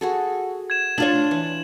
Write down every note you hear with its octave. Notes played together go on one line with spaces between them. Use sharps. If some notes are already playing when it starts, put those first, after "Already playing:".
F#4 G#4 A4
G#6 E7
D4 F4 C#5 F#7
E3